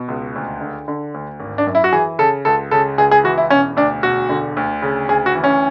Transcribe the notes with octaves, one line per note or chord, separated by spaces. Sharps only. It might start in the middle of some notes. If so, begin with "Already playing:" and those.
Already playing: B2
C#2
D2
D3
D3
D2
G#1
D4
F#2
E4
F#4
E3 G#4
C#3 A4
C#2 A4
C#3 A4
C#2 G#4
G#4
E3 F#4
E4
E1 C#4
D2 D4
E1 F#4
D3
D2
C#3
D2 G#4
F#4
E3
C#4